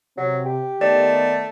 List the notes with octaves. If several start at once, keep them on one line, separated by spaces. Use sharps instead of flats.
C3 F#3
G4
D#3 A3 B3 D5